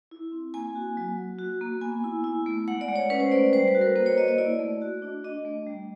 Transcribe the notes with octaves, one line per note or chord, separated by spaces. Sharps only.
E4
C4
A#3 G#5
F#4
F#3
F#3
F#4
A#3
B3 G#5
E4
E4
A3
G#3 F#5
D5
G#3
C#5
C#4 B4
C5
A3 D5
G3 C5
B4
F#4
A#4
A#3 C5
C#5
A#3 D#5
D#5
E4 D5
A3
F#4
D4
D4 D#5
A3
G3